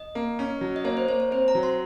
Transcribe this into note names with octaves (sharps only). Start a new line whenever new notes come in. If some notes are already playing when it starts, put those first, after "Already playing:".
Already playing: D#5
A#3
C#4
F#3
D#5
A#3 C#5
C5
A#3 C#5
C#5
C4 C5
A#5
F#3
C6